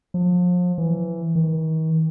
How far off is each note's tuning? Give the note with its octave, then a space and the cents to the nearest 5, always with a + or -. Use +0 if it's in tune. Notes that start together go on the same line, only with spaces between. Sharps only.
F3 +35
E3 +10
D#3 +40